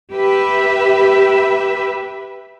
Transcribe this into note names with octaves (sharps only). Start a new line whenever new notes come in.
G4 B4 E5